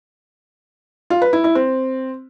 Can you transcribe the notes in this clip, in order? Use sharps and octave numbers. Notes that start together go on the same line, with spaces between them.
F4
B4
E4
E4
C4